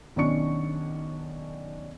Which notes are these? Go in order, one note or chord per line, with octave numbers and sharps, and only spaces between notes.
B1 D#3 C#4 D4 C#6 C#7